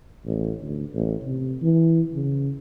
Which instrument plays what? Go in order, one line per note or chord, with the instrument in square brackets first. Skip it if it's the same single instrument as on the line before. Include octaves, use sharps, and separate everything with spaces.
[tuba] A1
D2
A1
C3
E3
C#3